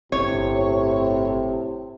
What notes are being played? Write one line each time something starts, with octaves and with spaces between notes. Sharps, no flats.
G1 A2 C3 C#5